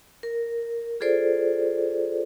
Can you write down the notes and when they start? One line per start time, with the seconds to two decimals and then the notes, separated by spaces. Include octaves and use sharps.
0.23 A#4
1.00 F4 G#4 A4 C5 D5